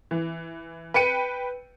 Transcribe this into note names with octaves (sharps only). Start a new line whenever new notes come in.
E3
B4 G5 C#7 D#7